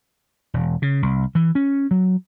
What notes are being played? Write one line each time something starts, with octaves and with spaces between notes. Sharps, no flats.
E1
C#3
C2
E3
C#4
F#3